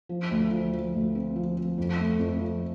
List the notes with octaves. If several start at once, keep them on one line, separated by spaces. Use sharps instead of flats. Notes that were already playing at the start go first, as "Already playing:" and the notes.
F3
D2
F3
F3
D2
C4
F3
F3
F2
A3
F2
F3